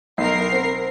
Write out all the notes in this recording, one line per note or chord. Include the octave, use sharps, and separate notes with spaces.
B1 A#4 C7
C4